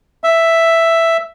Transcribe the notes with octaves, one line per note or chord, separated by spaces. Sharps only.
E5